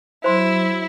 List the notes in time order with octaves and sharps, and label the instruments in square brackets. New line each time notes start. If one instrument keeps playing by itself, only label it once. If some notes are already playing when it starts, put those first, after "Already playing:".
[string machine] F#3 E6 [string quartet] E4 [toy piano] C5 C6